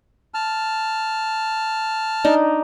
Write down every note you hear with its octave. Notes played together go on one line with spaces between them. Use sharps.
A5 F6
D4 D#4